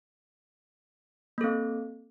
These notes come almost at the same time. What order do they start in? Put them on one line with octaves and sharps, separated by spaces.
A#3 A4 C4